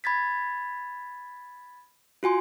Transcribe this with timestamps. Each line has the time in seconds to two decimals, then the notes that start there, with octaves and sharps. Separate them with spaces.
0.04 B5 G#6 A6 B6
2.23 F4 F#4 G#5 C6